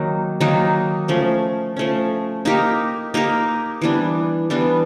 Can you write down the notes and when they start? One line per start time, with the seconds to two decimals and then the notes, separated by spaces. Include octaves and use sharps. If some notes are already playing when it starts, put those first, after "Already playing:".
Already playing: D#3 F#3 A#3 D#4
0.40 D#3 F#3 A#3 D#4
1.08 F3 A3 C#4
1.76 F3 A3 C#4
2.45 A#3 D#4 G4 A#4
3.14 A#3 D#4 G4 A#4
3.81 E3 G3 B3 D4
4.50 E3 G3 B3 D4